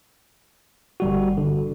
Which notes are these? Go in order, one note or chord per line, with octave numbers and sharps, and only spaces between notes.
G1 G3 F#4
D3